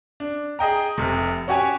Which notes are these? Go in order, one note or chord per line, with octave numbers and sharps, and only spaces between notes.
D4
G#4 D#5 G5 A#5
F1 C3
C#4 F#4 G4 C#5 G#5